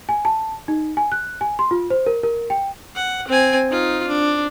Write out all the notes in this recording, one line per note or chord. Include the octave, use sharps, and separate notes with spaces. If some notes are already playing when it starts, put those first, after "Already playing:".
G#5
A5
D#4
G#5
F#6
G#5
C6
F4
C5
A#4
A#4
G5
F#5
C4 G#5
D#4 F4
D4